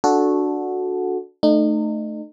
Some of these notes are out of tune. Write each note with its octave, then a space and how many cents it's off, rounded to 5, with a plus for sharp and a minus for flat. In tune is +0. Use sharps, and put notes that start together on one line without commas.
D4 +0 F#4 -10 A4 -15
A3 +0 D#4 -35